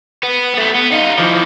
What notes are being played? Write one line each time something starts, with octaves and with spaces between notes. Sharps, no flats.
B3
A3 B3
B3
D#4 F4
E3 F3